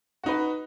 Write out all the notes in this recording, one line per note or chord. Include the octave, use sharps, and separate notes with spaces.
D#4 F#4 B4